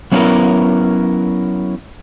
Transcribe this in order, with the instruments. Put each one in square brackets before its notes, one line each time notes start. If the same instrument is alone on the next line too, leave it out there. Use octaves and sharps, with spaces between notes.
[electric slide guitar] F#3 B3 C#4 D4 E4 A#4